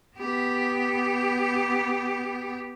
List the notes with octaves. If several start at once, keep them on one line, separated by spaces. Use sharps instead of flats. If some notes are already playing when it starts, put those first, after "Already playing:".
B3 G4